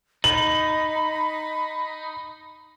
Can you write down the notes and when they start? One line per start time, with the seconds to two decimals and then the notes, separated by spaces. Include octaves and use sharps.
0.24 D#4 B5 F#7